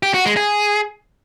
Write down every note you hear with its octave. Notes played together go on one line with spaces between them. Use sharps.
G4
F#4
G#3
G#4